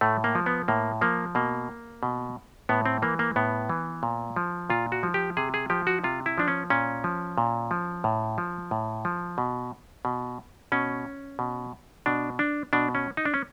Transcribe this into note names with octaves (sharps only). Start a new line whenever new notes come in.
A2 A3
A#3
F3
B3
A2 A#3
F3 A#3
B2 A#3
B2
A2 B3
C4
E3 A#3
A#3
A2 B3
E3
A#2
F3
A#2 F4
F#4
F3
G4
C3 G#4
G#4
F3 G4
F#4
C3 F4
E4
F3 D4
C#4
A#2 C#4
F3
A#2
F3
A2
F3
A2
F3
B2
B2
B2 C#4
B2
B2 D4
D4
B2 D4
C#4
D#4
D4
C#4